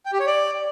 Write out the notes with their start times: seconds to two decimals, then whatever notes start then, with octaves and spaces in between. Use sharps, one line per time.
0.06 G5
0.13 G4
0.20 C#5
0.27 D5